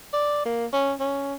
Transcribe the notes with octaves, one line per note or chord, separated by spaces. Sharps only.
D5
A#3
C#4
C#4